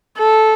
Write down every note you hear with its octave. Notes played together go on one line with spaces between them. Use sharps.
A4